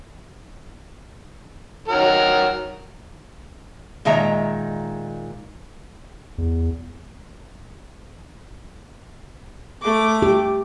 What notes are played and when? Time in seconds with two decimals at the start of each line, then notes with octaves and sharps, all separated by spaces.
1.88 D#3 F#3 A#4
4.05 A#2 D#3 G#3 E5 A#5
6.38 E2
9.82 A3 D6
10.22 G4